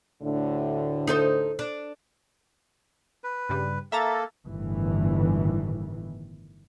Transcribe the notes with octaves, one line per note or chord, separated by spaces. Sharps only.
D2 A2 D3
D#4 A4 C5
D4
B4
G2 C#3 G3
A#3 A4 E5 A#5 A6
G1 A2 D#3 E3